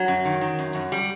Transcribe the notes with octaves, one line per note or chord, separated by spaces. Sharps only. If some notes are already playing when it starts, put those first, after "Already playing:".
Already playing: F#3
F#2
D#3
D#3
F#2
F#2
G3